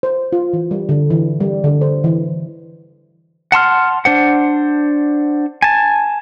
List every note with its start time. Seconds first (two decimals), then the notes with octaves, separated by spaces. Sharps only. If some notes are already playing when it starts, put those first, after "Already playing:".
0.03 C5
0.33 F4
0.53 E3
0.71 G3
0.89 D3
1.10 E3
1.40 G3
1.64 D3
1.81 C5
2.04 E3
3.52 F#5 A5 C6 F6
4.05 D4 C5 F#5
5.62 G#5 A5